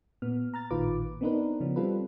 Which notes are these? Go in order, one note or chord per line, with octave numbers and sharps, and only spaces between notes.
A#2 B3 F6
A#5 F6 A6
A1 A#2 D#3 F4 B4 D6
B3 C4 D4 D#4 A#4 B4
C#3 F3 B3 C#4
G3 C4 F4 A4 B4